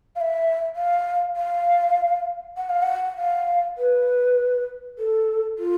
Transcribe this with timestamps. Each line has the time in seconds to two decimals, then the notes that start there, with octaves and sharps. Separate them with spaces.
0.16 F5
0.21 E5
0.76 F5
1.36 F5
2.57 F#5
2.70 F5
2.83 F#5
3.17 F5
3.78 B4
4.99 A4
5.59 F4